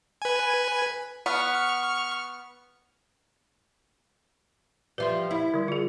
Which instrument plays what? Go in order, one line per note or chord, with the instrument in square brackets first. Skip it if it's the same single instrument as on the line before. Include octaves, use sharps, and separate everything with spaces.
[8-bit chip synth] B4 G#5
[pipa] B3 [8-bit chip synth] C#6 F6
[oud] F3 G3 [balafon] B4 E5 C6
[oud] E4
[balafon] D3 G3
F4 G#4